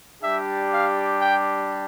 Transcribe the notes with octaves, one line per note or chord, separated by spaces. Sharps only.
G3 D4 G4 E5
F5
G5